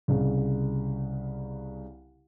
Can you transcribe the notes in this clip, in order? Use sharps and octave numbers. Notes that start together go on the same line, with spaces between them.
C2 C#3